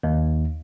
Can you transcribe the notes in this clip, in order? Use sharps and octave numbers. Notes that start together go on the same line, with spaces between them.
D#2